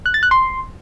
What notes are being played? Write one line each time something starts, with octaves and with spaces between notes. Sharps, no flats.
F#6
A6
F#6
C6